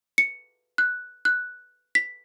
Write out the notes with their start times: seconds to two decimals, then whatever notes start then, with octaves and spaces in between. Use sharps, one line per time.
0.18 C#7
0.78 F#6
1.25 F#6
1.95 B6